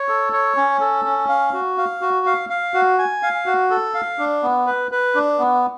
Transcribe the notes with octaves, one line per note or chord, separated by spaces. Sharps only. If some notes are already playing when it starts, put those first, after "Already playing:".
Already playing: C#5
A4
C#5
C#4
A4
C#4
F5
F#4
F5
F#4
F5
F5
F#4
G#5
F5
F#4
A4
F5
D4
B3
B4
B4
D4
B3